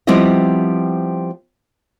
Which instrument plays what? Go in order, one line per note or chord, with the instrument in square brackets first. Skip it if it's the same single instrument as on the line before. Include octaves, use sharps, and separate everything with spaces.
[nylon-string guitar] F3 G3 B3 C4 E4 D#5